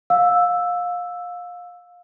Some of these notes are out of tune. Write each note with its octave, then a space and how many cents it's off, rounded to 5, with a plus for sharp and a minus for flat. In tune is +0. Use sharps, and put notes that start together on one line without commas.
F5 +25 E6 +0